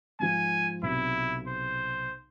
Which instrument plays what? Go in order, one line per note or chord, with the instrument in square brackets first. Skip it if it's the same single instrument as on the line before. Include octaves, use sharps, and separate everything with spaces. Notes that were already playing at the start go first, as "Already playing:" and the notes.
[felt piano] G#2 F3 [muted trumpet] G#5
[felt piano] B1 C3 [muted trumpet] E4
[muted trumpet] C5